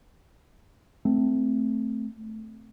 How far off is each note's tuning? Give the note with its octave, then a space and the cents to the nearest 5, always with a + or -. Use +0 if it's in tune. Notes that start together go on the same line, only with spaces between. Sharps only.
A3 +0 C4 -10